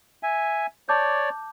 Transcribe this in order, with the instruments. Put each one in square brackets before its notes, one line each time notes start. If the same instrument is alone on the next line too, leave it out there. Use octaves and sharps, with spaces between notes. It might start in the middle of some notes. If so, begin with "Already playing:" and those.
[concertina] E5 G#5
[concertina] C#5 D5 [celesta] A5 D6 G6